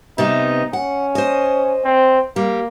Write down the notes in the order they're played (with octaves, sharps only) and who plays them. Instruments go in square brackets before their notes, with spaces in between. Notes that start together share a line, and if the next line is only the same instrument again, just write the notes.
[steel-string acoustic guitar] C3 G3 B3 [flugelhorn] D#4
[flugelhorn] C#4 [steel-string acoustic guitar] F#5
[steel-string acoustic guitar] C5 D#5
[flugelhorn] C4
[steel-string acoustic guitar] G3 [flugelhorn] A#3